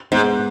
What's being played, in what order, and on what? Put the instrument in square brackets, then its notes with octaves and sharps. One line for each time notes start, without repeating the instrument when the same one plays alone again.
[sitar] G#2 [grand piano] G#3 B3 G#4 B4